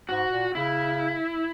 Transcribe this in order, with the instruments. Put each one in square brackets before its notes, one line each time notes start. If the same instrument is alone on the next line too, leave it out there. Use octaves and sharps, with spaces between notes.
[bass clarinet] G#2 [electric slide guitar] F#4
[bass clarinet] A#2
[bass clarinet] C#3 [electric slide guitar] E4